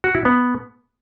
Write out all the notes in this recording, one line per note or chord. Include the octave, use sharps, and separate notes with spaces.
F#4
E4
B3